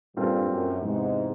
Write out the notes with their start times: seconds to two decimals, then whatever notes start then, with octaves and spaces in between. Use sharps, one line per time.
0.17 G2 A#2 G3 C4 F4 A4
0.49 F#2
0.82 E2 G#2 C3 E3 G#3